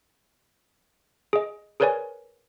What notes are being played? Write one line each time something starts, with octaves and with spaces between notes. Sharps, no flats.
G#4 D#5
G#4 A#4 B4 C#5 D5 G#5